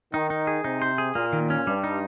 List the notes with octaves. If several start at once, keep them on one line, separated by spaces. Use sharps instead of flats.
D#3 D#4
D#4
G#4
C3 D#4
C5
G#4
A#2 A#3
D#3
C#4
G2 G3
D#4